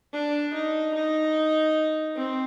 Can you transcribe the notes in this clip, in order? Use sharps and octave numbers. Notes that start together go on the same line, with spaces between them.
D4
D#4
D#4
C4